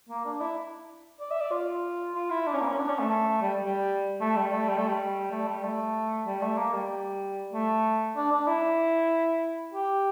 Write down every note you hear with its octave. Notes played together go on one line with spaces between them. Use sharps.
A#3
D4
E4
D5
E5
D5
F4
F4
E4
D4
C#4
A#3
C#4
D4
C#4
A3
A3
G3
G3
A3
G3
A3
G3
A3
G3
A3
G3
A3
G3
A3
A#3
G3
A3
D4
D4
E4
G4